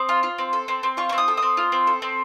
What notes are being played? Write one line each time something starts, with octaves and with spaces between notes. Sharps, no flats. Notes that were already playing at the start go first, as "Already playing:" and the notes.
Already playing: C4 D#6
F4
F4
C4
A4
C4
C4
F4 C#6
C#6
C4
D#6
A4
D#6
C4
F4
C4
A4
C4